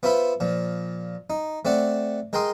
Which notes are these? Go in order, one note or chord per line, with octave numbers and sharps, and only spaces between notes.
B3 F4 C5 E5 B5
A#2 F3
D#4
A3 C4 D5 F#5
G#3 A#4 G5 C6 D#6